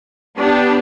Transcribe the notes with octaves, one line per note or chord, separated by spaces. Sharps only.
B3 D4 G4